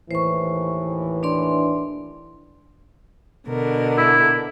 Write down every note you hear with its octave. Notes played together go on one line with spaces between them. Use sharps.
D#2 A2 E3 C5 C#6
D4 D5 C6
B2 D3 A#4
E4